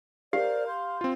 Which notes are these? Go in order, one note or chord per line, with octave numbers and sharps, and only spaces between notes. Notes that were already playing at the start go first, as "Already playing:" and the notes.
G4 A#4 C5 D5 F5
C6 G6
C4 F4